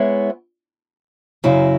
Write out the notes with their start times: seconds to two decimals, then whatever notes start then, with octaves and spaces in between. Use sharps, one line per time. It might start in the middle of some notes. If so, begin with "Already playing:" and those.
Already playing: G#3 B3 E4 C#5
1.44 F#2 C#3 F#3 E4